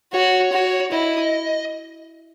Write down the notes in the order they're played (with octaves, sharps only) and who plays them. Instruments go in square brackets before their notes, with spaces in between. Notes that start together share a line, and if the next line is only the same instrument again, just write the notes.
[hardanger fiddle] F#4 [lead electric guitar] C#5
[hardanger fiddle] F#4
[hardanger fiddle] E4 [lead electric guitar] D#5